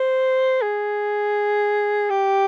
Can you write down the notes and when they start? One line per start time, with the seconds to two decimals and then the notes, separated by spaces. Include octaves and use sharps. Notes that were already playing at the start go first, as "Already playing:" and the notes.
Already playing: C5
0.62 G#4
2.10 G4